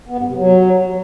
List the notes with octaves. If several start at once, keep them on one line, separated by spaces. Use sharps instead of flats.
B3
G2
C3
F#3